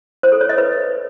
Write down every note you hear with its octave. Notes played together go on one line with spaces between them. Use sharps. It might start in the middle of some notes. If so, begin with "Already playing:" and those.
C5
A4
C#5
D#5
B4